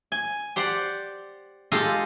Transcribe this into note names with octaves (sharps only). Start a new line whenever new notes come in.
G#5
G4 C5 D5 F#5
G#3 F4 G4 A4 D#5 F5